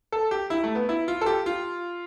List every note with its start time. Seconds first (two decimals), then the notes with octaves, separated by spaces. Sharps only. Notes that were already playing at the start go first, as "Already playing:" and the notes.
0.12 A4
0.31 G4
0.50 E4
0.64 A3
0.75 B3
0.89 E4
1.08 F4
1.21 A4
1.26 G4
1.46 F4